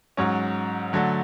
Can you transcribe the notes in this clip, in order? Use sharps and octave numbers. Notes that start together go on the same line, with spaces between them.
G#2 F#3 C#4
D3 F#3 A3